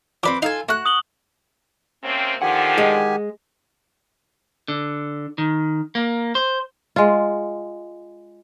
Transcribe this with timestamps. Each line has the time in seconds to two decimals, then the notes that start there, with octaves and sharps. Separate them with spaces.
0.23 F3 C4 B4 D5 D6
0.42 D#4 F4 A4 G#5
0.69 A3 F#4 F#6
0.86 D#6 F#7 G7
2.03 C3 A#3 C4 C#4
2.42 D3 D#3 F3 G4 F#5 G#5
2.78 G#3
4.68 D3
5.38 D#3
5.95 A#3
6.35 C5
6.96 G#3 F4